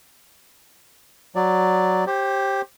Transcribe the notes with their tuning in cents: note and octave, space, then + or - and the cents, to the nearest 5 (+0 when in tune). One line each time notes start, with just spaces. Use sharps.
F#3 +0 D5 +0
G4 +0 C5 +35